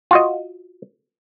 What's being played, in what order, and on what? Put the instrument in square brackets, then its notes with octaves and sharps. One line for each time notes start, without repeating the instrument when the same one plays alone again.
[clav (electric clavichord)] F4 F#4 D#5